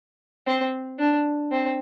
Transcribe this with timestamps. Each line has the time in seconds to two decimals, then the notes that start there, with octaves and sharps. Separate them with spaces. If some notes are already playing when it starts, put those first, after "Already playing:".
0.47 C4
0.99 D4
1.51 C4